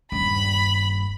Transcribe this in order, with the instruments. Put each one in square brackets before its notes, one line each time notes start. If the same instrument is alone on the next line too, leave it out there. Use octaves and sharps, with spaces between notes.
[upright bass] D#1 G2 [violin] B5